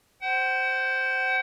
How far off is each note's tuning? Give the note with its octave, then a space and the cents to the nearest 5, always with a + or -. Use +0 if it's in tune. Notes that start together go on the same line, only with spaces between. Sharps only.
C5 +0 F#5 +40